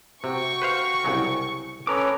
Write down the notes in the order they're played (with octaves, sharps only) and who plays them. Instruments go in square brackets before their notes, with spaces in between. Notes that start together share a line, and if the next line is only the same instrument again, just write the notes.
[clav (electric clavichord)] C3 [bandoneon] F#4 G5 [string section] C#6
[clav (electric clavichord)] B4 C5 F5
C2 C#3 F#3
[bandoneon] C#4 A4 B4 [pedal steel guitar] C#5 A#5 D6